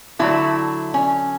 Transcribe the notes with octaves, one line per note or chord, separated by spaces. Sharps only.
D3 F#3 A3 E4
C#4